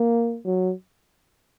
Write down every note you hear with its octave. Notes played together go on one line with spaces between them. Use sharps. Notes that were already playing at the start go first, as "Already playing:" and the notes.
Already playing: A#3
F#3